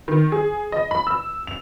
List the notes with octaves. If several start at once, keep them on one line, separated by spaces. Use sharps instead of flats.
D#3
G#4
D#5
B5
E6
F7